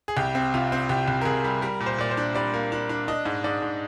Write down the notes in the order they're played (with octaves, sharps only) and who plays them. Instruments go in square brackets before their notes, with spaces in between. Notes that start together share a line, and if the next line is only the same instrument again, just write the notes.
[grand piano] G#4
C2 G4
C4
C3 F4
C4
C2 G4
C2
A#4
C2 G#4
G3
G3 A#4
A#2
C5
A#2 D5
C5
D4
G3 D5
A#3
D4
D4
D4 D#5
G#2
G#2 D5
G#2